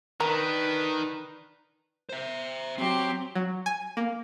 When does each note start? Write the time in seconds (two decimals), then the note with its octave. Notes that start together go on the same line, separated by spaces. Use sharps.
0.20 D#3 D4 A#4 B4
2.09 C5 E5
2.78 F#3 C4 G4
3.35 F#3
3.66 G#5
3.97 A#3